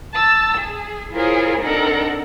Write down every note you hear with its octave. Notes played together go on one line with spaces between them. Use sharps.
A5 E6
G#4
E4 F4 G#4 A#4 C5 C#5
C4 D4 D#4 A4 A#4 F#5